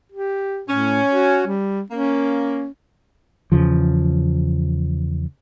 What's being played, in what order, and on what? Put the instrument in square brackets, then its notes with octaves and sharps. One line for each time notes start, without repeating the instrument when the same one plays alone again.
[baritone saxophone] G4
[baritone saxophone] A2 [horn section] C#4
[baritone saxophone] F#4
G3
[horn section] A#3 [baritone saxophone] C#4
[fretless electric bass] E2 C#3 F3